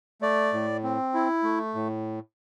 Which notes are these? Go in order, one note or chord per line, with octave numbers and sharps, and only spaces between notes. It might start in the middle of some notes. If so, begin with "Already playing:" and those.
A3 D5
A2
C4
E4
A3
A2